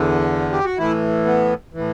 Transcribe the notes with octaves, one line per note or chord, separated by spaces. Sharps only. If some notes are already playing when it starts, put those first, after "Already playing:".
Already playing: E2 D3
G4
F#4
A2 E3 E4
B3
A2 E3